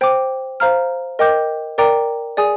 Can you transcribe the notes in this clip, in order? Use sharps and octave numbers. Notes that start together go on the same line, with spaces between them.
C5 G5 D6
C5 F5 A#5 F6
A#4 D#5 G5 D6 G6
A#4 D5 G5 A#5 D6
G#4 D5 G#5 D#6